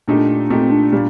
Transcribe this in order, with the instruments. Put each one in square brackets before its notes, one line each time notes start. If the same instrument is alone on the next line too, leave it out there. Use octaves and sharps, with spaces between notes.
[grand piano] A#2 A3 D#4 G4 [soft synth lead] D4
[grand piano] A#2 A3 D#4 G4 [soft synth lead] C4
[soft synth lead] D4
[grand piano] A#2 G3 A#3